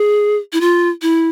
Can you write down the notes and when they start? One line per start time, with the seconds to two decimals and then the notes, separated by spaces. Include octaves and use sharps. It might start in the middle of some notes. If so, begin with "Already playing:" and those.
Already playing: G#4
0.53 E4
0.61 F4
1.02 E4